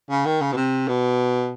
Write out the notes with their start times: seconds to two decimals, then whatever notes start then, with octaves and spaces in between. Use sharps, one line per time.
0.10 C#3
0.25 D#3
0.41 C#3
0.52 B2
0.56 C3
0.88 B2